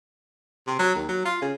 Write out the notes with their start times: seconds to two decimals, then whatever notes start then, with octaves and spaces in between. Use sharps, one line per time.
0.67 C3
0.79 F#3
0.95 D#2
1.09 F#3
1.25 F4
1.42 C#3